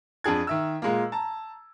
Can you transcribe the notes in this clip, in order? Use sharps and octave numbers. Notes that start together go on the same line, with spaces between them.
F2 D4 G#4 G#6
D#3 E5 E6
A#2 G#3 A#3
A5 A#5